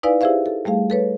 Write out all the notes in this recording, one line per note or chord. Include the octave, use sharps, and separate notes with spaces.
D#4 E4 B4 D5 F5 G#5
E4 G4 G#4 C5 E5 F5
A4
G3 A3 G#4 F5
A4 B4 C#5